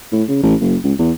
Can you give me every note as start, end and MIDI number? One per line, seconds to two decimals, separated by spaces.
0.12 0.23 45
0.28 0.38 49
0.43 0.54 33
0.60 0.76 30
0.84 0.93 37
0.99 1.11 40